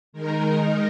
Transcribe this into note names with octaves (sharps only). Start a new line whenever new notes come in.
D#3 G#3 D#4 A#4